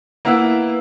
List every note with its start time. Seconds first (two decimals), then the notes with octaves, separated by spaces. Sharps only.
0.25 A#3 B3 E4 B4 E6